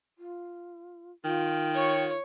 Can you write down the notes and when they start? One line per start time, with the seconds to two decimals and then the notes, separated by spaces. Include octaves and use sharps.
0.18 F4
1.24 D#3 F4 G5
1.74 C#5 C#6